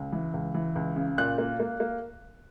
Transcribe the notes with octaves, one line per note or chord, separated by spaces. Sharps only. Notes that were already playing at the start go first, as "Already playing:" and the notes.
Already playing: C#2
E3
C#2
E3
C#2
C#3
A#2 F#6
A#3
A#3
A#3